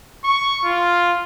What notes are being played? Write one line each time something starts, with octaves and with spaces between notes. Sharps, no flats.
C#6
F4